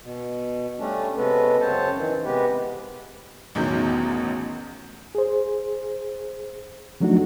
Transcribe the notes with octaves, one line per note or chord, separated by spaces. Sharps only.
B2
G3 A3 C#4 D4
C3 G#3 B3 C#4 A4 B4
F#2 C#3 C4 C5 C#5 A5
D#3 E3
C3 G#3 B3 G4 B4
A1 E2 B2 D#3 F#3 G6
G#4 C5
F3 F#3 A3 D4 D#4 F#4